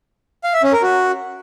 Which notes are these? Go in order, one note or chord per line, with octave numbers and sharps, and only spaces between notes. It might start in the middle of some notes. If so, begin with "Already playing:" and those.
F5
E5
C#4
A#4
F#4